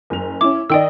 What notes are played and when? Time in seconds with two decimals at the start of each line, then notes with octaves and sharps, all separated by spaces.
0.10 F#1 F7
0.41 C#4 E4 D6
0.70 D#3 D5 D#5 G5 E6